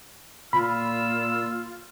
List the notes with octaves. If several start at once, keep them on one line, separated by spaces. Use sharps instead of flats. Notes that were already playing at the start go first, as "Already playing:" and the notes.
A#2 F4 B5 E6